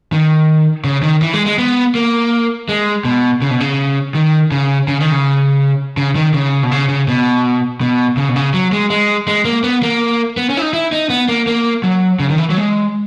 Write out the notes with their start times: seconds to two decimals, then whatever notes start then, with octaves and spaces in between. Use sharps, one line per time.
0.12 D#3
0.84 C#3
1.03 D#3
1.22 E3
1.33 G#3
1.46 G#3
1.59 B3
1.95 A#3
2.69 G#3
3.05 B2
3.42 C#3
3.51 B2
3.60 C#3
4.15 D#3
4.52 C#3
4.88 C#3
5.00 D#3
5.12 C#3
5.97 C#3
6.15 D#3
6.34 C#3
6.63 B2
6.71 C#3
6.89 C#3
7.08 B2
7.81 B2
8.17 C#3
8.29 B2
8.36 C#3
8.54 F#3
8.72 G#3
8.90 G#3
9.28 G#3
9.45 A#3
9.64 B3
9.83 A#3
10.37 B3
10.50 C#4
10.57 E4
10.62 D#4
10.73 E4
10.92 D#4
11.10 B3
11.29 A#3
11.47 A#3
11.84 F#3
12.20 C#3
12.30 D#3
12.38 E3
12.50 F#3
12.57 G#3